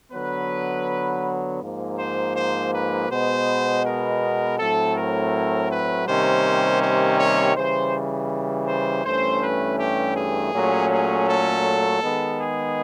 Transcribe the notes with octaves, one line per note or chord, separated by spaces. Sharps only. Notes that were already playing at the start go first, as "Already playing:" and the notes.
D3 F#3 B3 B4
G#2 F3 A#3
C5
C5
B4
B2 G#3 B3 C5
A#4
A2 F#3 A3 C4 A4
A#4
B4
C3 D#3 G3 A#3 C#4 C5
C5
C#5
C#3 E3 G3 C5
C5
G2 E3 A3 C#4 C5
B4
G4
G#4
A#2 F#3 A3 C#4
G#4
A4
D#3 G#3 B3
G#4